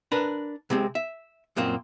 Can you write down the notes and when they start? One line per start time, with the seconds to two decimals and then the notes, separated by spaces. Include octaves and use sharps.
0.12 D4 A#4 B4
0.70 C3 G#3 C4
0.95 E5
1.56 F#2 A#2 A#3 C4